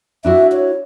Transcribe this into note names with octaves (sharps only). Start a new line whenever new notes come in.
D4 E4 F#4 E5
C#5